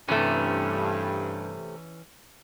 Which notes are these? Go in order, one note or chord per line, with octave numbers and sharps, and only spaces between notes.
G2 C3 E3 A3 C#4